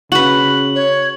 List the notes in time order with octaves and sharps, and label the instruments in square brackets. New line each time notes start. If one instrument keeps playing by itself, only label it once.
[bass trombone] C#3 [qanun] F#4 B4 [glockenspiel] F#7
[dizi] C#5